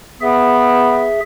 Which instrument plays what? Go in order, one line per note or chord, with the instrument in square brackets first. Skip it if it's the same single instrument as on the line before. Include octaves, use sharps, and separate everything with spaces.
[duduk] B3 [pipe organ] G#4 E5